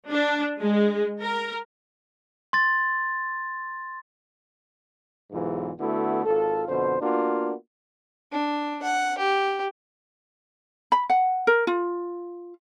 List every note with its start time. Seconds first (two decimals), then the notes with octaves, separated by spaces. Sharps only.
0.12 D4
0.61 G#3
1.24 A#4
2.53 C6 A6
5.32 B1 E2 G#2 E3 F4
5.80 D3 A3 B3 E4 F#4
6.26 G#1 F4 A4
6.69 F2 B2 D3 C5
7.01 A#3 B3 D4 F4 F#4
8.32 D4
8.83 F#5
9.18 G4
10.92 B5
11.10 F#5
11.47 A#4
11.67 F4